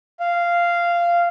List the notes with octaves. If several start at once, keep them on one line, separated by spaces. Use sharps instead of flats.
F5